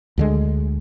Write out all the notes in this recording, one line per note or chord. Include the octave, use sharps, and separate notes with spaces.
D2 D3 G#3